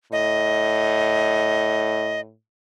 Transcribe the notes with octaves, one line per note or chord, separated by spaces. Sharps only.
A2 D#5